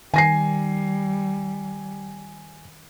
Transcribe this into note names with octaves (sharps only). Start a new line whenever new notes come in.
D#3 G3 G#5 A#6 C7